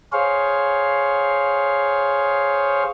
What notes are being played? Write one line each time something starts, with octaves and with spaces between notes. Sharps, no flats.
G#4 C5 C#5 F5